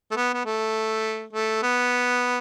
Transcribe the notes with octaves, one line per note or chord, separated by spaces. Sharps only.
A3
B3
B3
A3
A3
B3